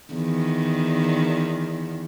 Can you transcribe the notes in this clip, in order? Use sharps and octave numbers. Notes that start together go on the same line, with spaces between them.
E2 D#3